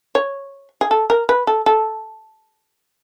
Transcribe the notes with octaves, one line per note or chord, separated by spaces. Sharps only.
C#5
G#4
A4
A#4
B4
A4
A4